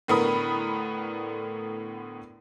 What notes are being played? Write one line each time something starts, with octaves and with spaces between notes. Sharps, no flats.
A2 D3 B3 A#4 B5 D#6